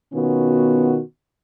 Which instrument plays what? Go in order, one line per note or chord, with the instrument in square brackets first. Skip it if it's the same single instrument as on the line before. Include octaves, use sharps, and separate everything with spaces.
[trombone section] B2 D#3 B3 C#4 F4 F#4